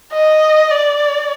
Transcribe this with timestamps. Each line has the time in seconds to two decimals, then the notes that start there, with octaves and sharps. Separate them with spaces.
0.13 D#5
0.71 D5